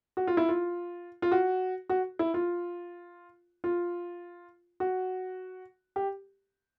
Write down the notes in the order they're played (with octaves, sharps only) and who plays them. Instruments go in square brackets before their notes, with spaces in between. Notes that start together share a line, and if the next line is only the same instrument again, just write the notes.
[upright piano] F#4
F4
E4
F4
F4
F#4
F#4
E4
F4
F4
F#4
G4